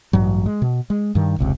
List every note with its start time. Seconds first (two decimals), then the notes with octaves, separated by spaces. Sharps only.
0.13 A1 G2 F#3
0.46 G#3
0.62 B2
0.90 G#3
1.15 G2 D#3
1.39 F1 C#2 C3